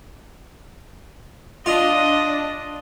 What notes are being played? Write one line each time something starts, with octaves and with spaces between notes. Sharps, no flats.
D4 F4 D#5